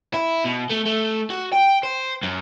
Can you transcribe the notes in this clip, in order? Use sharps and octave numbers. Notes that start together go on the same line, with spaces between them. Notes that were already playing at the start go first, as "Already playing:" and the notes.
E4
B2
A3
A3
F#4
G5
C5
F#2